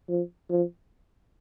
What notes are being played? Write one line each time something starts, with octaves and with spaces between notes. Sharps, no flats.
F3
F3